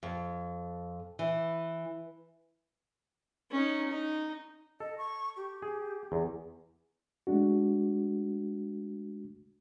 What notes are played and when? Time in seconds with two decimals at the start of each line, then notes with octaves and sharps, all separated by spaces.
0.03 F2
1.19 E3
3.51 C#4 D#4
3.88 D#4
4.80 A4 D#5
4.98 C#6
5.37 G4
5.62 G#4
6.12 E2
7.27 G#3 A3 D4 F#4